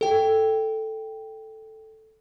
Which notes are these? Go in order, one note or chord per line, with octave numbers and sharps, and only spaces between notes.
A4 G5